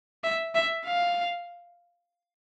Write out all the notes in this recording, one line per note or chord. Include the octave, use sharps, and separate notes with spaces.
E5
E5
F5